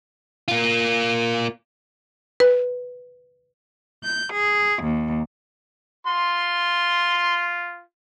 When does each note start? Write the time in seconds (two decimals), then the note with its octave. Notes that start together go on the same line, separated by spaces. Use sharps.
0.48 A#3 F4
2.40 B4
4.02 G6
4.34 G#4
4.82 D#2
6.07 F4 C6